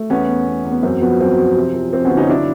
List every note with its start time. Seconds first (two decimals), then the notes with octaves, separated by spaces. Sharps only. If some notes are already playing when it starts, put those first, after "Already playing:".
Already playing: A3
0.10 E2 B3 C#4
0.29 E2
0.47 E2
0.65 E2
0.72 B3
0.83 F#2 C4
1.02 F3 B3
1.20 F#2 C4
1.39 F3
1.57 C3
1.75 F3
1.93 F3 C4
2.05 B3 C#4
2.11 G1
2.17 C#4 D#4
2.29 F#3 D4 E4